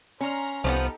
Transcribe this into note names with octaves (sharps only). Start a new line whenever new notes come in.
C#4 A#5 C6 F6
C2 F3 A3 B3 D#4 G4 A4